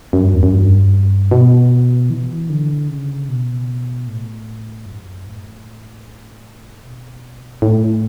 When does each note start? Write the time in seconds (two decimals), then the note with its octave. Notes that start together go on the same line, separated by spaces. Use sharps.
0.13 F#2
0.23 G2
0.34 E2
0.43 F#2
0.53 G2
1.31 B2
2.10 E3
2.50 D3
2.89 C#3
3.29 B2
4.07 A2
4.86 F#2
5.26 A2
6.83 B2
7.62 A2